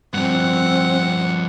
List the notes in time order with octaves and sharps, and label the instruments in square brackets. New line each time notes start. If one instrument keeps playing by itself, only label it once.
[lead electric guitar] G2 F3 [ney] C4 [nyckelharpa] F#5